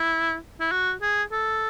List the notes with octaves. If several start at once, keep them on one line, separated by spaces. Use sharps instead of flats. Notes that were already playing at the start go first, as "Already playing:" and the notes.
Already playing: E4
E4
F#4
G#4
A4